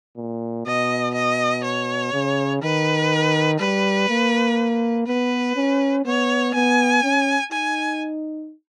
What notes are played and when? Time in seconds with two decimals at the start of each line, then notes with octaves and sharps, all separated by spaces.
0.17 A#2
0.66 B2 D#5
1.14 D#5
1.64 C#5
2.13 C#3
2.62 D#3 B4
3.59 G3 B4
4.09 A#3
5.06 B3 B4
5.56 C#4
6.05 B3 C#5
6.54 B3 G#5
7.03 C#4
7.52 D#4 G#5